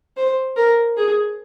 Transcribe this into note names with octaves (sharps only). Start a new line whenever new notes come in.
C5
A#4
G#4